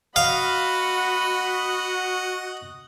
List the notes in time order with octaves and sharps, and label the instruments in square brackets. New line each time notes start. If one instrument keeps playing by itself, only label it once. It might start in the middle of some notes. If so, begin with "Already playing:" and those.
[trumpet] F#4 [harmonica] D#5 F#5 [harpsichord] F5 [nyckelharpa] B5